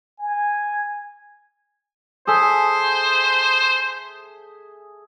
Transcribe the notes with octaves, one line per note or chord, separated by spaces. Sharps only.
G#5
G#4 A4 C5 E5